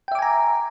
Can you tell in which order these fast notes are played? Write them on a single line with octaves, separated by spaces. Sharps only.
G5 E5 D6 G#5 A#5